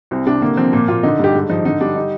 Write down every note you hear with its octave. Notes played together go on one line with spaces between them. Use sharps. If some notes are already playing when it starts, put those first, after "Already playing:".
C2 C4
C3 D4
D3 A#3
F3 C4
A#2 A#3
A#2 F4
D3 D#4
G2 G4
G#2
F3 D#4
D3 D#4
G3 D4
D#4